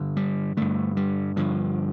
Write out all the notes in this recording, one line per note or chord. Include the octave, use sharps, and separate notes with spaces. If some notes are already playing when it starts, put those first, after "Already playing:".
Already playing: G2 D3
G3
G2 D3 A3
G3
G2 D3 F3